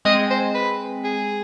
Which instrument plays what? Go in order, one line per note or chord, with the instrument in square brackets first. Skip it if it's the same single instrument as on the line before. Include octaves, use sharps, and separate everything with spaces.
[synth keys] G#3 C4 [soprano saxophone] D#5
[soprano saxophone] C5
B4
G#4